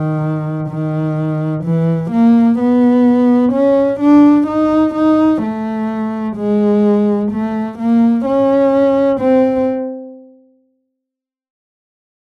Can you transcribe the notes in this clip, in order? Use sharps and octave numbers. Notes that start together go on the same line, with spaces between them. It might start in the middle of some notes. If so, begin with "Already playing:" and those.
Already playing: D#3
D#3
E3
A#3
B3
C#4
D4
D#4
D#4
A3
G#3
A3
A#3
C#4
C4